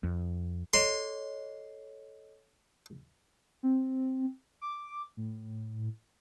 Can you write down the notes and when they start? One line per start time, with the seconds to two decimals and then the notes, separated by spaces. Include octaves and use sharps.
0.03 F2
0.73 A4 C#5 D#5 C6
3.63 C4
4.61 D6
5.17 A2